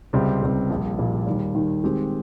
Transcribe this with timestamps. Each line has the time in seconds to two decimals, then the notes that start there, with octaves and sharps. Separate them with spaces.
0.13 C#2 C3 G3 C4
0.42 C#2 C3 G3 C4
0.70 A#1 A#2 G3
0.99 A#1 A#2 G3
1.27 D#2 D#3 G3
1.55 D#2 D#3 G3
1.83 D#3 G#3 C4 G4